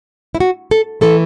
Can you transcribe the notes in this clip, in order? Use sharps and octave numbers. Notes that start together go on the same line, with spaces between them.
E4
F#4
A4
E3 A3 A4